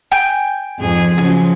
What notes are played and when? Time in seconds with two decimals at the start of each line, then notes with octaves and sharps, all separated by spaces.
0.12 G5 G#5 G6
0.80 F2 G#2 G#4
1.18 C#3 F3 F#3 G#5